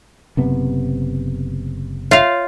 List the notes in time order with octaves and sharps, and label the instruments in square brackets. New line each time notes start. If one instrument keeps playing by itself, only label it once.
[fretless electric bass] F#1 C3 B3
[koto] F4 F5 [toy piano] C#5 E5